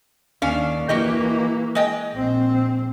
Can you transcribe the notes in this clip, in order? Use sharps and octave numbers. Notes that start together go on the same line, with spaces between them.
D#2 C#4 D4 F5
E3 A#3 F#4 G4 D#5
G#3 D#5 G5
A#1 C4